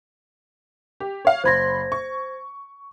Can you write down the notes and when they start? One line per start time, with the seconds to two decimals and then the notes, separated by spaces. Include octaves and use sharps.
1.00 G4
1.25 C#5 F5
1.44 F#1 C5 B5 C6 G#6 A#6
1.92 C#6